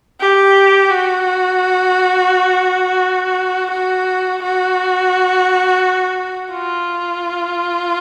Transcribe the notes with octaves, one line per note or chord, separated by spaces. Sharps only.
G4
F#4
F#4
F#4
F4